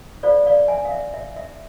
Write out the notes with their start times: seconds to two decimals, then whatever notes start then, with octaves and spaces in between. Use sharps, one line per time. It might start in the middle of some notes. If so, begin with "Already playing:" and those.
0.23 F4 A4 C5 D5 F5
0.46 D5 F5
0.68 E5 G#5
0.85 F5
0.91 E5
1.14 E5
1.36 E5